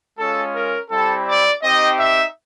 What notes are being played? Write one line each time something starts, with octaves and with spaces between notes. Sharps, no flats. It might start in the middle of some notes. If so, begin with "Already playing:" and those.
G#3 C#4 F4 A4
A#4
G3 C4 E4 G4 A4
D5
C4 D#4 G4 D#5
E5